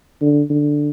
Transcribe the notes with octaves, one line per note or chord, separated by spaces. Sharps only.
D3
D3